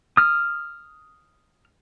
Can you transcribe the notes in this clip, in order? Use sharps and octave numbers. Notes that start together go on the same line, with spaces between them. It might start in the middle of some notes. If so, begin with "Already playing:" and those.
D#6 F6